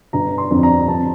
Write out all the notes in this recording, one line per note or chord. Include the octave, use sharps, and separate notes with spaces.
G1 A#5
C6
F2 D3
A#5
F2 A5